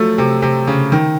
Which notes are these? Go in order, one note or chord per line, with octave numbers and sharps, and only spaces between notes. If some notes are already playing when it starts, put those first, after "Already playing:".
Already playing: F3 F#3 A3
C3
C3
C#3
D#3